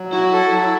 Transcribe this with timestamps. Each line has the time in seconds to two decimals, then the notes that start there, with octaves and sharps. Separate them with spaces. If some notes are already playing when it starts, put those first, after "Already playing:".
Already playing: F#3
0.13 E4 F#4
0.33 A4
0.52 F#3